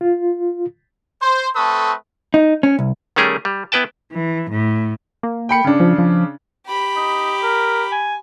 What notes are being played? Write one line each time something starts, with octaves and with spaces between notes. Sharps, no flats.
F4
C5
A3 C4 A4 B4 C#6 D#6
D#4
C#4
C2
D#3 G3 A3 C#4 G#4 A#4
G3
B3 E4 B4 G5 A5
E3
A2
A#3
G5 B5 C#7
C#3 D4
F3
F3
G4 B5
D#4
A#4
G#5